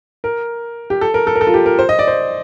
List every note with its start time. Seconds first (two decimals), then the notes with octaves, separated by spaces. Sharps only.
0.24 A#4
0.90 G4
1.01 A4
1.14 A#4
1.27 A4
1.36 A#4
1.41 A4
1.47 F4
1.54 G4
1.66 A#4
1.79 C5
1.89 D#5
1.99 D5
2.08 C5